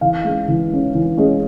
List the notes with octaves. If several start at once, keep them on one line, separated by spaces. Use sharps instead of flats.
E3 F5
G#3 C#4
E3
G#3 C#4
E3
G#3 C#4